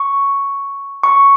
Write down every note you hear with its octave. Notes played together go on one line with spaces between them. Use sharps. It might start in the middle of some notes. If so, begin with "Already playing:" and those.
Already playing: C#6
C#6